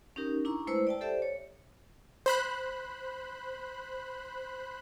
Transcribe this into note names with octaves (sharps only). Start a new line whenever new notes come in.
C#4 D#4 G4 A#4
D4 E4 A#5 C#6
G#3 A3 E4 B4 C5 E6
D5 G5 A5
G4 A4 C5 D5 E5
C#5
C5 B5 F#6